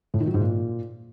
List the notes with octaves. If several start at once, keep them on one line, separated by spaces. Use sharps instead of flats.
A2
D#3
F#3
G#2
A#2